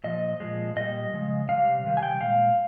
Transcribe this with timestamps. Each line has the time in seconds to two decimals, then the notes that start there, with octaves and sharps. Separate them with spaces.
0.04 A#2 F3 D#5
0.40 A#2 F3 G#3
0.76 A#2 G3 D#5
1.13 C#3 F3 G#3
1.49 C3 G3 F5
1.84 C3 D#3 G3
1.97 G#5
2.03 G5
2.21 A#2 G#3 F5